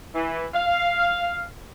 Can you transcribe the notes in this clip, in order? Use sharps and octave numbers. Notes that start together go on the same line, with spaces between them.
E3
F5